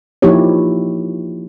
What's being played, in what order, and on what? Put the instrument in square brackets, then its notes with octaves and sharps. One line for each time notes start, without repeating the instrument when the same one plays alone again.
[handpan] F3 A#3 D#4 E4 G4 C#5